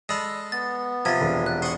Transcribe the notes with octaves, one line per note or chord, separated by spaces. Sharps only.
G#3 A4 D5 B5
B3 A6
C3 F3 G#6 A6
E1
F#6
C5 F#5 C#6 D#6